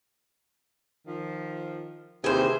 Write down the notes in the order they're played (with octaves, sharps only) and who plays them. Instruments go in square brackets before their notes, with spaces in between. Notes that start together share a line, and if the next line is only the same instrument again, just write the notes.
[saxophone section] D#3 F3
[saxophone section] D#2 E3 [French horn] C3 [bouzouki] G#4 C5